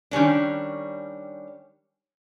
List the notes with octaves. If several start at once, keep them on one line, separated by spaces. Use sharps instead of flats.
D#3 G3 C#4 D4